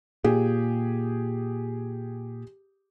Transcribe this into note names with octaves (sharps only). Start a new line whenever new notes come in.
A#2 G4 G#4